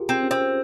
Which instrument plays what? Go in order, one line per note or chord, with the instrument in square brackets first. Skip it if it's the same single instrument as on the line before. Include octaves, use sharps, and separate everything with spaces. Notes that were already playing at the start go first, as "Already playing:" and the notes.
Already playing: [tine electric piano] F4 G4 G#4 A#4
[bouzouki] C4
[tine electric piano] C#4
[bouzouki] C4